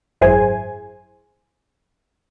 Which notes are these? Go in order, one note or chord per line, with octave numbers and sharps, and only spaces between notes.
G#1 F#2 E4 G#4 C5 G#5